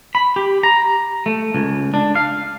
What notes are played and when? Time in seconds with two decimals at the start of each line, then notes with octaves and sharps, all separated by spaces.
0.15 B5
0.36 G4
0.63 A#5
1.26 A3
1.55 C#2
1.94 D4
2.15 F5